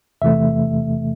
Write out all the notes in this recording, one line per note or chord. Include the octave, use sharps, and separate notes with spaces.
E2 C3 E3 A3 E5